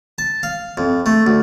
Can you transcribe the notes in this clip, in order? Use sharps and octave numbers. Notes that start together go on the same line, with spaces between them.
A5
F5
F2
A3
D2